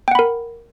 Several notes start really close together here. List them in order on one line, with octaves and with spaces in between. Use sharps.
G5 F#5 B5 A#4